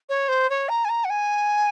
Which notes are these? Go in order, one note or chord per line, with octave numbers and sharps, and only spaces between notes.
C#5
C5
C#5
A#5
G#5
A#5
F#5
G#5